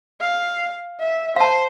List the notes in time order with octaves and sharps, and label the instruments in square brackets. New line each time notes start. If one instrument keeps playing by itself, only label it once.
[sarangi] F5
E5
[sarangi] C5 [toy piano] F5 A5